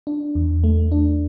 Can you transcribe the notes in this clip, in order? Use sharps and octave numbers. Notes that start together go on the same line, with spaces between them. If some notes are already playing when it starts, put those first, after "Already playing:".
D4
E2
A3
D4